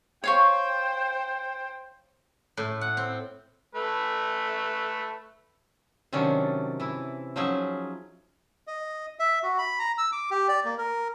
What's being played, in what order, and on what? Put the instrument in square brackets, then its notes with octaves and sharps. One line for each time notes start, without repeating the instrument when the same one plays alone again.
[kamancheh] C5 G5 [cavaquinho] C#5 F5 C#6
[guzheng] A2
F#5
C4
[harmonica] A3 A4 B4
[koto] C3 D#3 F#3 C#4 D4
E3 E4
F3 F#3 C#4 D#4 G#4 E5
[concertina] D#5
E5
F#4
B5
A#5
E6
D6
G4
D5
A#3
A#4